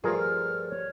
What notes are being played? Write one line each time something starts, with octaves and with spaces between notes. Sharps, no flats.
G2 F3 A3 F4 G#4 A#4
F6
C#5